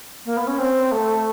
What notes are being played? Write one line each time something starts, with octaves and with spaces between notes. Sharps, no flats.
A#3
B3
C#4
C4
A3